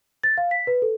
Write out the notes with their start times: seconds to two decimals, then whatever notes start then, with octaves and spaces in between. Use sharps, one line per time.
0.23 A6
0.38 F5
0.51 B6
0.67 B4
0.82 A4